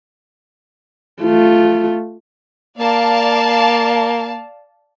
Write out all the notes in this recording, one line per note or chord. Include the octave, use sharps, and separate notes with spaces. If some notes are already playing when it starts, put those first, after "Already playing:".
A3 F4
A#3 D5 F5 A5